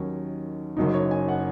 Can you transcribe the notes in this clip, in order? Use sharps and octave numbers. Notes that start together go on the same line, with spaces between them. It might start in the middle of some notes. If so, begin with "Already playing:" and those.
Already playing: D#2 D#3 F#3 C#4 D#5
F#1 F#2 F#3 D#4
C#5
G#5
F#5